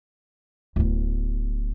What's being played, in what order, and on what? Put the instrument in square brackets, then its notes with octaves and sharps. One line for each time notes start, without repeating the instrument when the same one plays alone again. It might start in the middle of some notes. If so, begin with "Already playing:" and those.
[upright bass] D1 B3